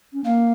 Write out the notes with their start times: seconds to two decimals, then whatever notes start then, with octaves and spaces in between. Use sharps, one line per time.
0.13 C#4
0.25 A#3 F5